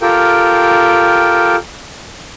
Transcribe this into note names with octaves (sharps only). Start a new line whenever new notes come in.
F4 G4 A4 A#4 G5